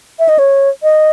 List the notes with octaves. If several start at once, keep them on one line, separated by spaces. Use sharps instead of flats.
E5
D#5
C#5
D#5